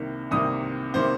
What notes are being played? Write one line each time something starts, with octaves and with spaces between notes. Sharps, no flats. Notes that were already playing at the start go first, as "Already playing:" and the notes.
Already playing: C2 C3 D#3 A#3
C2 C3 D#3 A#3 D#6
C3 D#3 A#3 C5